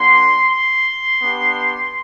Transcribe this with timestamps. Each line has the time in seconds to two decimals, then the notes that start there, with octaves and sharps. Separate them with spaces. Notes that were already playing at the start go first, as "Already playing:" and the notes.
Already playing: A#3 D4 F#4 C6
0.48 C6
1.21 B3 D4 G4